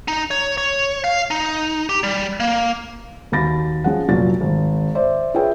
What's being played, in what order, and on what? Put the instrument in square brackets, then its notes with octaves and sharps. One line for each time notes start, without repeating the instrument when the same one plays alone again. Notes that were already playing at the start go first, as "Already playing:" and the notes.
[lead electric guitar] D#4
C#5
C#5
F5
D#4
G4
G3
A#3
[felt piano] D#2 F#4 B5 A6 A#6
F3 C#4 G#4 F#5
F1 A#2 F#3 F4 A6
G#1
C5 D5 E5
F4 G#4 B4 C#5 E5 G5